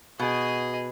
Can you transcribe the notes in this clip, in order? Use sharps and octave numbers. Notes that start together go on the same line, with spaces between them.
B2 G#4 D#5